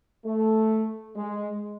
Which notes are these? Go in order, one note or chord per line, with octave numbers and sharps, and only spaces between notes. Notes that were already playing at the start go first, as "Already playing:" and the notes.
A3
G#3